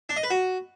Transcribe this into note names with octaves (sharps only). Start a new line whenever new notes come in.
D4
D#5
B4
F#4